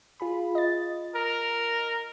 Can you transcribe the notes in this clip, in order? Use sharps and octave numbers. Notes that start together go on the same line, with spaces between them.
F4 G#4 B5
D#5 A6
A#4